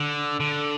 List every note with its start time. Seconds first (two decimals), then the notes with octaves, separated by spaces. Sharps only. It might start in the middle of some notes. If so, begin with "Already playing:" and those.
Already playing: D3
0.40 D3